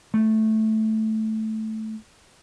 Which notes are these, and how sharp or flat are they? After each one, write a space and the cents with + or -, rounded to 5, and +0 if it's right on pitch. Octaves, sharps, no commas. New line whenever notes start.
A3 -5